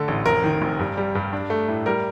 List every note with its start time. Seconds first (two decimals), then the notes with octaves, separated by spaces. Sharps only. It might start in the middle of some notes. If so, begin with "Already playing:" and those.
Already playing: D3 A3 A4
0.08 A1
0.26 F1 A#4
0.44 D#3
0.62 F1
0.79 G2
0.97 G3
1.15 G2
1.33 D4
1.50 A3
1.68 A2
1.86 G3 A#4